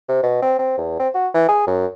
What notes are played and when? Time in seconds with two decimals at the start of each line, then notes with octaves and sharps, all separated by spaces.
0.08 C3
0.23 B2
0.42 C4
0.59 C4
0.78 E2
0.99 C4
1.14 F#4
1.34 E3
1.48 G#4
1.67 F#2